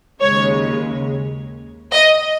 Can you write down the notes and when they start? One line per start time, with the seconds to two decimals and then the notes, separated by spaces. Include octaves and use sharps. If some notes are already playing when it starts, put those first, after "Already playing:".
0.20 D#2 C#3 G#3 C#5
1.92 D#5